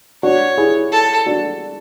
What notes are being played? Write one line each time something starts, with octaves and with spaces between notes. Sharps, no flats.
D4 F#4 C#5
E4 G#4
A4
D4 F#4